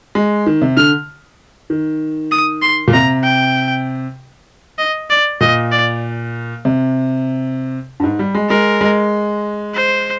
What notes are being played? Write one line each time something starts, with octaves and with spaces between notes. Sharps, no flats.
G#3
D#3
C3
D3 F6
D#3
D#6
C6
A#2
C3 A#5
G5
D#5
D5
A#2 D#5
D5
C3
G2
G#2
G3
G#3
G#3 A#4
G#3
C5